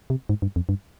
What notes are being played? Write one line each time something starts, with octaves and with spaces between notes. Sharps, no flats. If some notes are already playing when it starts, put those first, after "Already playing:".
C3
G#2
G2
F2
G2